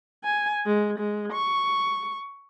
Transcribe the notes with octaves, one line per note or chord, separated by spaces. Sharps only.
G#5
G#3
G#3
C#6